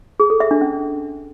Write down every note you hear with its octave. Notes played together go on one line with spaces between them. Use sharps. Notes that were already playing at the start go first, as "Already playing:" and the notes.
G#4
A4
E5
D4
C#4